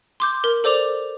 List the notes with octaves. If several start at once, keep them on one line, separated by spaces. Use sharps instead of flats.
C6 D6 G6
A#4
A4 C5 D5 D6 F7